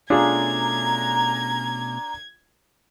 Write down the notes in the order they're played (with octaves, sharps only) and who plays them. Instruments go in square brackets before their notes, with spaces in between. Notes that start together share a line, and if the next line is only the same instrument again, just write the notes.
[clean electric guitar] B2 A3 C#4 [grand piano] D4 F4 G#4 [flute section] A#5 [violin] G#6